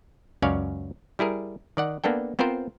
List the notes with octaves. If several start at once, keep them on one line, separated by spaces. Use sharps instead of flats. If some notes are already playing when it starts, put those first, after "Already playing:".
C#2 F#2 C#4 C#5 D5 F5
G3 E4 G#4 A#4
D#3 D5 F#5
A#3 B3 D4 A4 G5
B3 C4 F4 A#4 C5